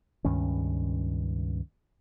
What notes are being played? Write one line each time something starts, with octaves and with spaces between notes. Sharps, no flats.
C#2 G2 D#3 C#4